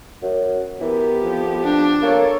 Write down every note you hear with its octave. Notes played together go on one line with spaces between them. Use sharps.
F#2 F#4
E3 B3 G4 A#4
F2 F3
D4
A#3 A4 C#5